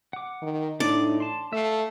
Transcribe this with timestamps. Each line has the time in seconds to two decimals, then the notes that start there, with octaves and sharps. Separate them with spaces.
0.13 F#5 D6
0.42 D#3
0.80 A2 D4 D#4 D5
1.20 A5 C6
1.53 A3 E5 F5